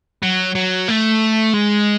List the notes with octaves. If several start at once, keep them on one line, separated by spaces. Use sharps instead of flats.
F#3
F#3
A3
G#3